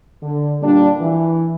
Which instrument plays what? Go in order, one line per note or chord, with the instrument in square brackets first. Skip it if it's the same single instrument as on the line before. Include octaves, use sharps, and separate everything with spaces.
[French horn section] D3
A#2 G3 A#3 D4
E3